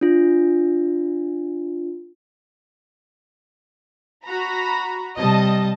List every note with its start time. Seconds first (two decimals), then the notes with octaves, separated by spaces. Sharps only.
0.01 D4 F4
4.26 F#4 A#5 B5
5.17 C3 G3 D#5 A5